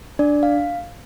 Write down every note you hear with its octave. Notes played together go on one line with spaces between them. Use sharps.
D4 D5
F5